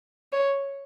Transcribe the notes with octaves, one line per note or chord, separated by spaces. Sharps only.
C#5